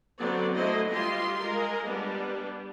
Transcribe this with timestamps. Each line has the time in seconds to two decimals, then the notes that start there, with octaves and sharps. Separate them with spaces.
0.18 D3 F#3 B3 C4 D5
0.54 D3 F#3 A3 E4 C5 D#5
0.91 G3 F4 G4 D#5 C6
1.39 G#3 A#4 D#5
1.86 G3 B3 D4